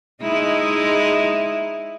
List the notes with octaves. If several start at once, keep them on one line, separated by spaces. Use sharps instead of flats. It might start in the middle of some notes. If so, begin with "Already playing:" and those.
G#3 D#4 E4